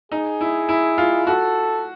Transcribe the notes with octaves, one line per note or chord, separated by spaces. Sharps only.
D#4 G#4
E4
E4
F4
F#4 A4